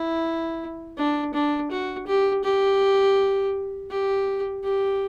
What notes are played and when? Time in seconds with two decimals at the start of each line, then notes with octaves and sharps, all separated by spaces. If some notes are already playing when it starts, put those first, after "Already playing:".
Already playing: E4
0.98 D4
1.34 D4
1.71 F#4
2.07 G4
2.44 G4
3.90 G4
4.63 G4